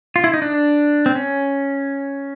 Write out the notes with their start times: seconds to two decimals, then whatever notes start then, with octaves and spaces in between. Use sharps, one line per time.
0.16 F4
0.24 E4
0.34 D#4
0.42 D4
1.06 C4
1.15 C#4